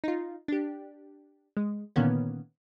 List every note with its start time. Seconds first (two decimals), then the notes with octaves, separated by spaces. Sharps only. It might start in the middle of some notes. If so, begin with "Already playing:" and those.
0.04 D#4 F4
0.48 D4 G4
1.57 G#3
1.96 A#2 D3 D#3 A#3 B3 C#4